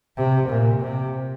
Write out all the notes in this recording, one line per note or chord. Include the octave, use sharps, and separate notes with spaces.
C3
A#2
C3